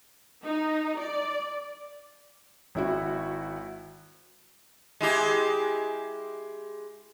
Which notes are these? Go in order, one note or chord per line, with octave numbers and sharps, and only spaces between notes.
D#4
D5
G#1 E4 F#4
G#3 E4 G4